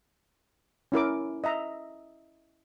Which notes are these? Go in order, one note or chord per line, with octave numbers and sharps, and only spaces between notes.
C#4 E4 A#4 D6
D#5 E5 A#5